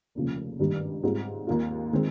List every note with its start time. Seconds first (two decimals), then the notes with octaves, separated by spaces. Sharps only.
0.15 F1 D#2 C#3 F3
0.59 G#1 G2 D#3 G3
1.03 G#2 G3 C4 F4 G#4
1.47 D#2 D#3 A#3 F4
1.93 D#3 G#3 C4